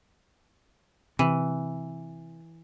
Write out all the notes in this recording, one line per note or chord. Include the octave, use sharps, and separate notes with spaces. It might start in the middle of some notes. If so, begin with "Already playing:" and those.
C3 E3